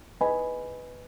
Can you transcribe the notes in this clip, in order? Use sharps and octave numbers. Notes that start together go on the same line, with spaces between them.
B4 D#5 G#5 B5